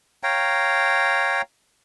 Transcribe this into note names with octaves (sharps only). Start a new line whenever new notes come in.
C#5 F5 G5 A#5